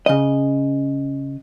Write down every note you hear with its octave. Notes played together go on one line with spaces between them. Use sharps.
C#3 D#5